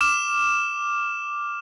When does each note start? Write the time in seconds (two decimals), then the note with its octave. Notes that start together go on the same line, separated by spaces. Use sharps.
0.01 D6 F6 E7